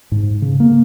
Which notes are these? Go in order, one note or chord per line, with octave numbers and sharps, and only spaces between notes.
G#2
C#3
A#3